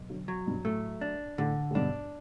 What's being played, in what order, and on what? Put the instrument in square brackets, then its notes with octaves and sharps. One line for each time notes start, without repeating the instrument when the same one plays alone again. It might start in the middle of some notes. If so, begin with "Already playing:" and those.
Already playing: [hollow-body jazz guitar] B1
[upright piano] D3 F#3
[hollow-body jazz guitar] F#3
[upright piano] G2 B2
[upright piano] A2 [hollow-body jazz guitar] A3
[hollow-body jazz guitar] D4
[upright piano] A2 [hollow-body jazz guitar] D3
[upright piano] A2
[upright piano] G2 B2 [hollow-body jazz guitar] D4